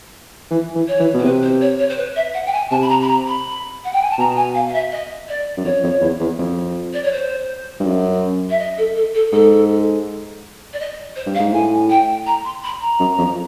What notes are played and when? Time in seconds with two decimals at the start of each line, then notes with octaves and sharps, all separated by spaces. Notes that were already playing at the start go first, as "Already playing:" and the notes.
0.51 E3
0.75 E3
0.88 C#5
1.00 E3
1.14 B2
1.19 C5
1.24 C3 B4
1.42 C5
1.61 C#5
1.79 C#5
1.90 C5
1.98 B4
2.16 E5
2.34 F#5
2.46 G5
2.52 G#5
2.71 C3 A5
2.82 B5
2.89 A#5
3.01 B5
3.08 A#5
3.27 B5
3.85 F#5
3.93 G5
4.02 G#5
4.10 A5
4.18 B2 A#5
4.36 G#5
4.55 F5
4.68 F5
4.74 E5
4.92 D#5
5.29 D5
5.57 F#2
5.65 F2 C#5
5.83 F2
6.01 E2
6.20 E2
6.39 F2
6.93 D5
7.04 C#5
7.12 C5
7.80 G2
7.85 F#2
8.50 E5
8.59 D#5
8.78 A4
8.95 A4
9.15 A4
9.33 G#2 A4
10.73 D5
10.80 D#5
11.16 C5
11.27 G2
11.35 F5
11.40 G#2
11.53 A2 G#5
11.90 G5
12.26 A#5
12.45 C6
12.64 B5
12.81 A#5
13.00 F#2
13.18 F2